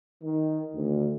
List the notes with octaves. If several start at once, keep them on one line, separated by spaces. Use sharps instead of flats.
D#3
D2